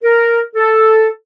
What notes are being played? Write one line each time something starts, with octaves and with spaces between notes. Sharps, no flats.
A#4
A4